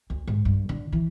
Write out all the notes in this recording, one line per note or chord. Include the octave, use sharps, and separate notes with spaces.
D2
G#2
G2
D3
E3